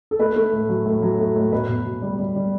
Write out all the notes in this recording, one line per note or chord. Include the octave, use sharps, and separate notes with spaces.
A4
A3 B4
A3
A2
F#3
A2
F#3
A3
A2
B2 B4
B2
B2
G3
G3
G3